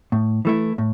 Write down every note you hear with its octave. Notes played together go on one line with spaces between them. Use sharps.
A2
E3 A3 E4
A2